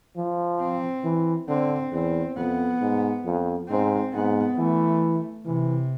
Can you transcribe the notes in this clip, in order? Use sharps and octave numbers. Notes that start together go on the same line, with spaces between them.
F3
C4
E3
D3 C4
E2 C4
F2 B3
G#2
F2
G#2 C4
G#2 B3
E3 A3
C3 E3